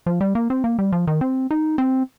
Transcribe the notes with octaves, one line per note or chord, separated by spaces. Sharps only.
F3
G3
A#3
C4
A#3
G3
F3
D#3
C4
D#4
C4